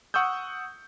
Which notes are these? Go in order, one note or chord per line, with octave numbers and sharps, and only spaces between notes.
F#5 C#6 D#6 E6 G6